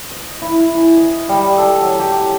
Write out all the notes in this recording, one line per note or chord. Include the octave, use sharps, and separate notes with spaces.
D#5
E4
G#5
D#5
G3
A4
F#3
G4